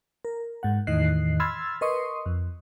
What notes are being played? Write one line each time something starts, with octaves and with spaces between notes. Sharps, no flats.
A#4
G#2 F#5
E2 A2 D#3 D#5 F#6 C7
B5 C6 E6 F6 G#6 A6
A#4 B4 D#5 C6 C#6 D#6
F2